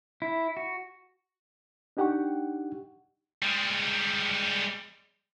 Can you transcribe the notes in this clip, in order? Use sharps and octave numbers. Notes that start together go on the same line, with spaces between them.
E4
F#4
D4 D#4 G4 F#5 G5 C#6
G3 G#3